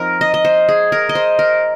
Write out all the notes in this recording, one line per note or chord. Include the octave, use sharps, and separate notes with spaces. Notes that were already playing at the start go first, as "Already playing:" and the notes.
Already playing: F3 C4 D#4 A#4
D#5
D#5
C5
G#4
A#4
D#5
C5
A#4